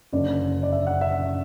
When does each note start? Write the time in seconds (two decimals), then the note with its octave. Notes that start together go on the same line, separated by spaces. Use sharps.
0.12 F#1 F#2 D3 D5
0.63 D5
0.72 E5
0.87 F#5
1.01 E5